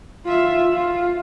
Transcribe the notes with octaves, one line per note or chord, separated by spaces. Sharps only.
F4 E5
F4